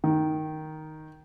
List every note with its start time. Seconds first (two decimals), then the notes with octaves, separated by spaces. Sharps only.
0.04 D#3